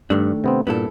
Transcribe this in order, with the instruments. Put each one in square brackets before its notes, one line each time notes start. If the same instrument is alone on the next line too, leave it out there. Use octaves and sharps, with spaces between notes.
[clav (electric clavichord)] G2 [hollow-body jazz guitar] D#3 A3 D4
[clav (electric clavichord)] C3 B3 C4
[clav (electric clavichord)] G2 A#2 [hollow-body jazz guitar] B3 E4 A4